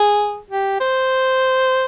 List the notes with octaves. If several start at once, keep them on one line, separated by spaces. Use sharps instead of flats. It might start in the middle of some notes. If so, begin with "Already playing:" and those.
Already playing: G#4
G4
C5